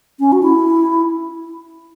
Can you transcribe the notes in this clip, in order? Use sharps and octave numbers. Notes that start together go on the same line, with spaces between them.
C#4
F#4
E4